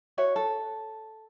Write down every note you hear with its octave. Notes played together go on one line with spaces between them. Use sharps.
F#4 C#5 E5
A4